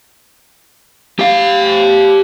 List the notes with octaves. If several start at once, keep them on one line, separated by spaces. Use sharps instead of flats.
G4 F5